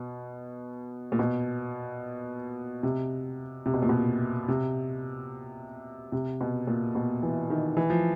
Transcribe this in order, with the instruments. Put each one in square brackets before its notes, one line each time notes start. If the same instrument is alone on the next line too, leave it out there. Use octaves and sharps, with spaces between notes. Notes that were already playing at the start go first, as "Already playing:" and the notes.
Already playing: [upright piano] B2
A#2
B2
C3
C3
B2
A#2
B2
C3
C3
B2
A#2
B2
E3
D#3
E3
F3